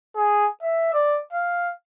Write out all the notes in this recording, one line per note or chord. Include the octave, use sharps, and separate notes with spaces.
G#4
E5
D5
F5